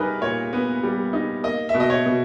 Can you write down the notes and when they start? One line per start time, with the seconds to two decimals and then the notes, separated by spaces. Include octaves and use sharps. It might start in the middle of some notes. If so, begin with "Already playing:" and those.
Already playing: G3 D#4 G#4 A#4 B4
0.21 A#2 C#5
0.53 B3
0.83 G3
1.13 D#4
1.44 A#3 D#5
1.69 E5
1.74 B2
1.80 D#5
1.90 C#5
2.06 B2